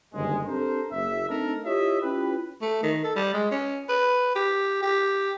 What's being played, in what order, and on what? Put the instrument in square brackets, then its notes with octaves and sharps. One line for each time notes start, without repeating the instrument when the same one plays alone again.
[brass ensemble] F#1 G2 D3 D#3 G#3
C4 D4 G4 A4 A#4 C5
F#1 E5
A3 C4 D4 D#4 A4 A#4
E4 F4 G4 C#5 D#5 E5
C#4 E4 F4 G4 B4
[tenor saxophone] A3
D#3
A4
G3
G#3
C#4
B4
G4
G4